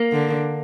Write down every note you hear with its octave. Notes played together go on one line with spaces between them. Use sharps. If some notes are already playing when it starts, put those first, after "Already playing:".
Already playing: A#3
D3